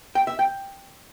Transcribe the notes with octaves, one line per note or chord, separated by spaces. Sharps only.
G5
E5
G5